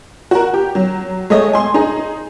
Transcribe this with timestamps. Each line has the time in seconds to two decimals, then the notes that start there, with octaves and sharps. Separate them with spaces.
0.31 F#4 A#4
0.54 G4
0.75 F#3
1.30 G#3 A3 C#5 D#5
1.53 G#5 C6
1.74 D#4 G#4